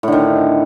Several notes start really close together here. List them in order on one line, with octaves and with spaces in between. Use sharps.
A2 D3 D#3